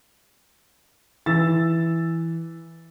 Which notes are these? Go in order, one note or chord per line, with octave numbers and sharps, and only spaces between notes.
E3 E6 A6